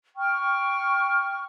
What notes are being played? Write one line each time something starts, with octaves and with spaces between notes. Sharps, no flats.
G5 C#6 F6